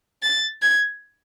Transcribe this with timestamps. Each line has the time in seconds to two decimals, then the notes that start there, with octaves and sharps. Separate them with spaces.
0.23 A6
0.62 G#6